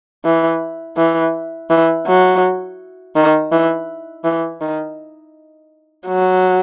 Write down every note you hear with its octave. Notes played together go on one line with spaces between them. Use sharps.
E3
E3
E3
F#3
D#3
E3
E3
D#3
F#3